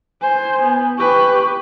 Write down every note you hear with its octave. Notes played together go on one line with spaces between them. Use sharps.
C5 G#5
B3
G4 B4 C#6